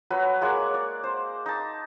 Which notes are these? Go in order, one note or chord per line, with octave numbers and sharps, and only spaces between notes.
F#3 B4 C#5
G#3 A#3 C#5 F#5
D5
C5
D#4 A5